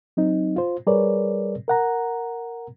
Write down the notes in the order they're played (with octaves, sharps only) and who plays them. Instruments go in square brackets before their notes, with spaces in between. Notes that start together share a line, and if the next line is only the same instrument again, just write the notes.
[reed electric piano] F#3 C4 D#4
F4 C5
G3 G#4 A#4 B4 C#5 D5
A#4 F#5 A#5